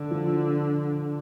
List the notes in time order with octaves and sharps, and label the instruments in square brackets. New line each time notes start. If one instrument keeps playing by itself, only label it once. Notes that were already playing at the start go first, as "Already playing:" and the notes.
Already playing: [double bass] D3
[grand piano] F3